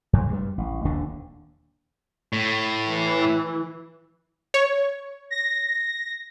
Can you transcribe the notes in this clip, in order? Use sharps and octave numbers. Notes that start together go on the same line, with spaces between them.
F2 G#2
G2 G3
A1
D#1 D#2 D3 D4
A2
E3
C#5
A#6